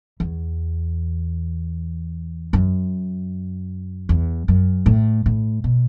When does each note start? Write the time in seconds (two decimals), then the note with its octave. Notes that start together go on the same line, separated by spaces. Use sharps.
0.20 E2
2.53 F#2
4.09 E2
4.48 F#2
4.86 A2
5.26 A2
5.64 B2